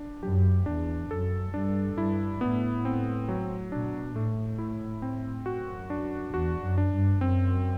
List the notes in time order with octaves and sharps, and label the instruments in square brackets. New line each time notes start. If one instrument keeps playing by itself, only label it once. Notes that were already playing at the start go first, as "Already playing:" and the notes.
Already playing: [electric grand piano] D4
[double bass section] F#2 [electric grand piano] G4
[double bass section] E2 [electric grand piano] D4
[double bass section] F#2 [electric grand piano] A4
[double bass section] G2 [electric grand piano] D4
[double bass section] G2 [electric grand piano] E4
[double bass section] A2 [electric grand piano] B3
[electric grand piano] C4
F#3
[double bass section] B2 [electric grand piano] D4
[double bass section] A2 [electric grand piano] A3
[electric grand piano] E4
C4
[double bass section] F#2 [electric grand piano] F#4
[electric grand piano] D4
[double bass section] E2 [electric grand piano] F#4
[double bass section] F#2
[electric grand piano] D4
[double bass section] G2
[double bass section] F#2 [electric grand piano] C4